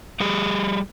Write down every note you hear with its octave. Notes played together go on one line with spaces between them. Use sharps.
G3 G4 G#4